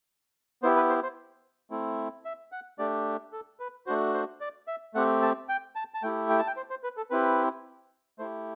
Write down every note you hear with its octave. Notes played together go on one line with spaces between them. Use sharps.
B3 E4 G4 C5
B4
C5
C5
A3 C4 E4
E5
F#5
A3 D4 G4 D5
A4
B4
A3 D4 F#4 C5
C5
D5
E5
A3 C4 G4 F#5
A5
G5
A5
A5
A3 E4 G4 G5
G5
A5
G5
C5
C5
B4
A4
C4 E4 G4 B4
A3 E4 G4 C5